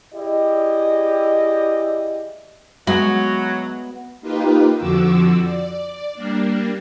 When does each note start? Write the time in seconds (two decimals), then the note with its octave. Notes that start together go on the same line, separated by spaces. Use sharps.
0.14 E4 G4 G#4 D5 D#5
2.87 F#3 G#3 B3 F#4 E5
4.21 A#3 D#4 F4 G4 B4
4.78 F2 D3 F3 F#4 D6 E6
5.43 D5
6.14 G3 A#3 D4